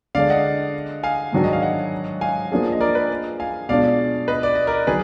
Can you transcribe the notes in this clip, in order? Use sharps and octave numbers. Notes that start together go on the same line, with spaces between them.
D3 G#3 D4 D5 F5
D#5 F#5
F5 G#5
G#2 D#3 F#3 D4 F#4
D#5
F5
D#5 F#5
F5 G#5
F3 A#3 D4 G#4
D#5
A#4 D5
B4 D#5
F5 G#5
B2 G#3 D4 F4 D5 F5
B4 D#5
D5
D#5
A#4 D5
D#3 F#3 G#4 B4